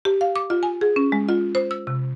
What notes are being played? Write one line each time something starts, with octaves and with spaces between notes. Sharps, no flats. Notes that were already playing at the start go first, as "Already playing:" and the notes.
G4
F5
D6
F4
G#5
G#4
C#4
G#3
F4
C5
E6
C3